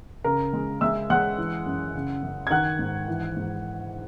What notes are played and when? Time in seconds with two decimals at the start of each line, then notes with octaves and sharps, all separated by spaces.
0.24 C#3 A#4 A#5
0.53 G#3
0.81 G#3 E5 E6
1.10 G#3 F#5 F#6
1.38 E3
1.66 F#2
1.94 C#3
2.23 F#2
2.47 G#6
2.50 D#3 F#5 F#6
2.79 G#2
3.08 E3
3.36 G#2